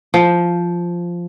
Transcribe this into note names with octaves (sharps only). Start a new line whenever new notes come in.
F3